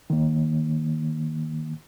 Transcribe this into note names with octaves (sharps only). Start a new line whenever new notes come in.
D#3 A#3